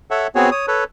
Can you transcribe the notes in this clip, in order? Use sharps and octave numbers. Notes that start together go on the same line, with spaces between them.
A4 C#5 E5 F#5
B3 C4 F#4 G#4 C#5
C#5 D#6
A4 B4 C#5